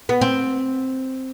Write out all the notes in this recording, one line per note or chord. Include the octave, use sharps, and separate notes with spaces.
B3
C4